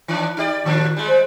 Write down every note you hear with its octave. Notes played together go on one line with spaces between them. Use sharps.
D#3 E3 D4
D#4 G4 D5
A2 D#3 F3 D4
G3 G#3
C5